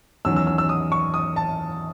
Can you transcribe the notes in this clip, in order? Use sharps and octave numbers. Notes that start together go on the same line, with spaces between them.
E2 D#3 F#3 C#4 E6
E6
E6
E6
D#6
C#6
D#6
A5